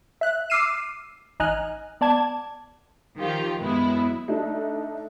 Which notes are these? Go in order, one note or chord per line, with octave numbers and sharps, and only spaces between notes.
E5 F#6
D6 E6 F6 C7 D#7 E7
A1 D#4 D#5 G#5 F6 F#6
B3 D5 A5 G#6
D#3 F3 F4 G4
F#2 G#3 B3 E4
A3 D4 D#4